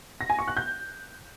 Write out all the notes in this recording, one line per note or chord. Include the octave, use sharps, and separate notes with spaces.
A#6
G#5
C#6
F#6
G6